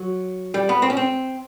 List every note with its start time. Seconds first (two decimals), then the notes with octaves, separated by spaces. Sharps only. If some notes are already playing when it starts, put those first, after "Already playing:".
Already playing: F#3
0.54 G3
0.69 B3
0.82 C4
0.90 C#4
0.97 C4